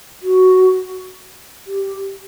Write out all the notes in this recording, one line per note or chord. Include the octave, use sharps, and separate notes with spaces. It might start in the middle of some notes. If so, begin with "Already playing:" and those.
F#4
G4